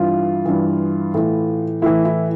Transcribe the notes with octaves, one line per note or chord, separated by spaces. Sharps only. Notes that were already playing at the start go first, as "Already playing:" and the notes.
Already playing: G2 E3 F4
G2 E3
A2 E3
A2 E3 E4
E4